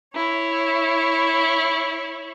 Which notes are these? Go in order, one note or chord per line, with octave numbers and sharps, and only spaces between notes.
E4 C#5